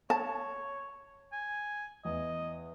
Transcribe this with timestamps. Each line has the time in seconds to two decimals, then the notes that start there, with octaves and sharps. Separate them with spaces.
0.10 C#5 A5
1.33 G#5
2.05 E2 D#5